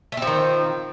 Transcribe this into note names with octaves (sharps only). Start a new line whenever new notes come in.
D#3 F3 A3 C4